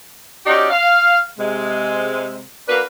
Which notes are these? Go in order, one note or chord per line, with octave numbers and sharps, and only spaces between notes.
C#4 D#4 F#4 G4 D5
F5
C3 G#3
A#3 D4 F#4 B4